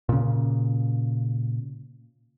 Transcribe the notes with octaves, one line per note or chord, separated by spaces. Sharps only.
A#2 C#3